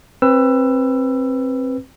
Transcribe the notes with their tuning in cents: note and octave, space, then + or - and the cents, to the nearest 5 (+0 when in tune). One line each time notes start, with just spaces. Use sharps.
C4 +20 B4 +0 E6 +20